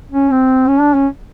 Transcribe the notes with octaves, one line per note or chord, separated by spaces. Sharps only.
C#4
C4
C#4
D4
C#4